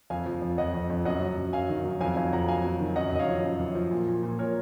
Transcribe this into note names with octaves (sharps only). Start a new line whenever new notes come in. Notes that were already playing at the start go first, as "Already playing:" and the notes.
F2 F5 G#5
F3
F2
F2 D#5 F#5
F2
F2
F#2 D#5 F#5
F#3
F#2
F#2 F5 G#5
D#3
F#3
F2 F5 G#5
F2 F5 G#5
F2 F#5 A#5
F#3 F5 G#5
F#3
D#3
F#2 D#5 F#5
F#2 D#5
C#5 F5
F3
F#2
F#2
F3
A#2
A#2
A#2
A#2 A#4 C#5